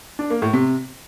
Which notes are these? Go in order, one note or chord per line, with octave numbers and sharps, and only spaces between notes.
D4
A#3
A2
C3